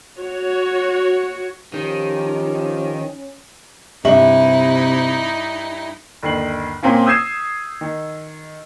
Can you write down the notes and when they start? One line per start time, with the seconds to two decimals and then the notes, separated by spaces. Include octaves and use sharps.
0.19 F#4 C#5
1.74 D#3 F3 C#4 G4
4.05 G2 C3 D#4 E4 E5 C#6 F#7
6.23 G1 D#2 C7 F#7
6.83 A#2 A#3 C4 C#4 F4
7.06 D#6 E6 G6 G#6 C7 E7
7.81 D#3